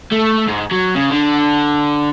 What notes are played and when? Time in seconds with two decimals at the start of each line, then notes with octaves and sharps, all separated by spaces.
0.12 A3
0.48 G#2
0.71 F#3
0.95 C#3
1.11 D3